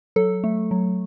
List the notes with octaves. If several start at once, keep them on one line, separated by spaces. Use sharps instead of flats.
F#3 A4
A3
F#3